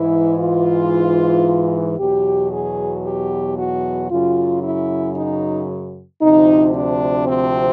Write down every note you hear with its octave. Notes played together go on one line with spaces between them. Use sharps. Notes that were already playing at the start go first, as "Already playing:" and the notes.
Already playing: G#2 E3 E4
F4
E2 B2 F#3 G4
G#4
G4
F#4
F#2 C#3 F#3 F4
E4
D#4
D2 C3 F3 D#4
D4
C4